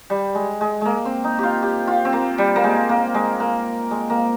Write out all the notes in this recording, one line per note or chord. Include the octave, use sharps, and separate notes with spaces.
G3
G#3
G#3
G#3 A#3
C4
D#4
F4 G4
G4
F4
C4
A#3
G3
A#3
G#3
A#3
G#3
A#3
G#3
A#3